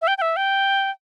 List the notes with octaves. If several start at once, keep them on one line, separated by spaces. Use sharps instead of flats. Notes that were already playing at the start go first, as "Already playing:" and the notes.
E5
G5
G5
E5
G5